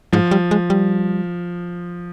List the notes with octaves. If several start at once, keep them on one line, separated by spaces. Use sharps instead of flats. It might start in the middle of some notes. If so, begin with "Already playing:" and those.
G#2 F3
G3
G#3
G3